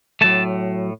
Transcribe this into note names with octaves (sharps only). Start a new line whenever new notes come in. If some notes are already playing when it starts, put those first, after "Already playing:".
A2 F#3 A3 A5